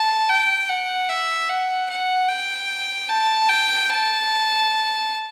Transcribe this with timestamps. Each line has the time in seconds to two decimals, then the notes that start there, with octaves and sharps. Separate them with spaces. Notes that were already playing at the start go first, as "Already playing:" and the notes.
Already playing: A5
0.29 G5
0.68 F#5
1.09 E5
1.49 F#5
1.89 F#5
2.29 G5
3.09 A5
3.49 G5
3.90 A5